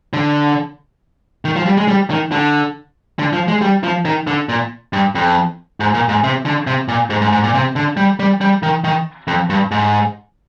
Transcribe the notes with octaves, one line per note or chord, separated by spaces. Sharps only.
D3
D#3
F3
G3
G#3
G3
D#3
D3
D3
F3
G#3
G3
F3
D#3
D3
A#2
G2
F2
G#2
A#2
G#2
C3
D3
C3
A#2
G#2
G#2
G#2
A#2
C3
D3
G3
G3
G3
D#3
D#3
F2
G2
G#2